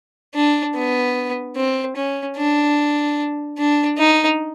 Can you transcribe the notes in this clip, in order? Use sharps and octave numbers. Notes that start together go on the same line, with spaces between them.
D4
B3
C4
C#4
D4
D4
D#4